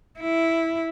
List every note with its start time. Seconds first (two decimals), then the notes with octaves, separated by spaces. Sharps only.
0.20 E4